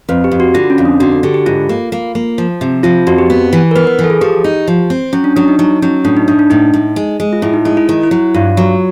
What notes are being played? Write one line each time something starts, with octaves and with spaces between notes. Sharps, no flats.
F2 B4
G4
F2
F#4
D3 F4
C#4
F2
D4
D3 F#4
F#4
D3 G4
G4
G#2 F4
A#3
A#3
A#3
F3
C3
F3 F4
F2 F#4
G4
B3
E3
A#4
B3 B4
B4
E3
A4
G#4
F3 G4
D#4
F3
C4
F#3 C#4
D4
F#3 D4
D#4
F#3 D#4
F#3 C#4
A2 D4
D#4
A2 D4
D4
A2 D#4
A2
G#3
G#3
F4
A2 E4
D#4
G#3 E4
E4
D#3 E4
E4
F#3
G2 F4
F#3